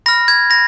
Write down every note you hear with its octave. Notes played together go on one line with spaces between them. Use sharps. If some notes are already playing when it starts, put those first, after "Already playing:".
B5 F6 A#6
G#6
B5 A#6